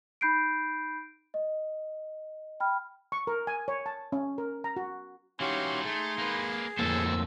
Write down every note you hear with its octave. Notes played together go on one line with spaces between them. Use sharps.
D#4 B5 G6 C7 D7
D#5
G5 B5 F6
C#6
A#4
G#5
C#5
A5
C#4
A#4
A#5
F#4
E3 C#4 D#4 F#4 G4 F5 C6
A3 G#4
A#3 B4
F2 A2 A#3 A4 C5 E6